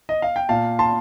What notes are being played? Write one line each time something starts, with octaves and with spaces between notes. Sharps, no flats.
D#5
F5
G5
A#2 F5 A5
A5 C6